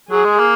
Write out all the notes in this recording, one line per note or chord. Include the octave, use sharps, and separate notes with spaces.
F#3 G#4
G#3
A#3